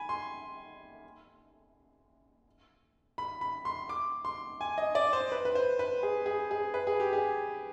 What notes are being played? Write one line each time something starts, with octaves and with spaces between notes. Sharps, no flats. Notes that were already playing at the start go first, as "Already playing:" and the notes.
Already playing: G#5 B5
C6
B5
B5
C6
D6
C6
G#5
D#5
D5
C5
B4
B4
C5
B4
G#4
G#4
G#4
B4
G#4
G4
G#4